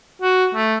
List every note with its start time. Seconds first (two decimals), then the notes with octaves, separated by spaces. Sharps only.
0.22 F#4
0.55 A3